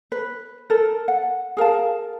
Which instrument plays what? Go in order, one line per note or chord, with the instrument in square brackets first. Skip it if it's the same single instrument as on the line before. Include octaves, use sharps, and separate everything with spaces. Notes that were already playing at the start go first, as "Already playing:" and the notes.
[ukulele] B4
A4 A#4
F#5
G#4 A#4 F5 A5